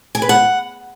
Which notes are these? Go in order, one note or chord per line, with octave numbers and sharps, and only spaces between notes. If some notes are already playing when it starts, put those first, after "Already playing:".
G#5
B4
F#5